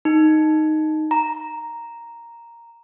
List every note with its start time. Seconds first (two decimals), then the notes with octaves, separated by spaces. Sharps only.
0.05 D#4
1.11 A#5